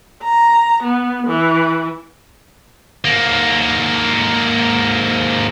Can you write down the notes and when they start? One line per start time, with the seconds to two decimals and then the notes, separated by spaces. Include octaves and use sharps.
0.23 A#5
0.83 B3
1.27 E3
3.05 G#2 A#3